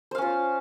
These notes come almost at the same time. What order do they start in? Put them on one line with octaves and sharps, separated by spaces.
C5 F5 C#4 F4